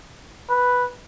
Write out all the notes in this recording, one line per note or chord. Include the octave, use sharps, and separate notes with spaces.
B4